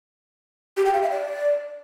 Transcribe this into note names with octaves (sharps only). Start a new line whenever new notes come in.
G4
G5
F5
E5
D5